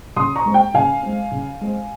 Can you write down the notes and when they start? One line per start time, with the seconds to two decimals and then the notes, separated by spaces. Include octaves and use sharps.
0.16 C#3 C6 D#6
0.36 A#5 C#6
0.46 G#3 C4
0.54 G5
0.74 C#3 F5 G#5
1.03 G#3 C4
1.31 C#3
1.61 G#3 C4